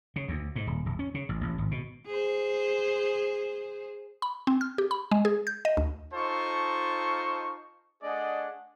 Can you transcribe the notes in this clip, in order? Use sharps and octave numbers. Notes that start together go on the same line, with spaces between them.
C#3
D2
G#2
D#1
E1
C#4
C#3
A1
A1
G#1
B2
G#4 C5
B5
C4
F6
G4
B5
G#3
G#4
G6
D#5
D2
D#4 F4 A4 C5 A5 C#6
A3 D4 G#4 D5 D#5 F#5